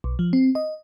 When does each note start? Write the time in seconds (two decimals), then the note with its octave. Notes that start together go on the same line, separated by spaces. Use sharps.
0.04 B1
0.19 F3
0.33 C4
0.55 D#5